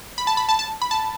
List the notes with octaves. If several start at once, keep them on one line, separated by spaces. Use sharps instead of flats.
B5
A5
B5
A5
A5
B5
A5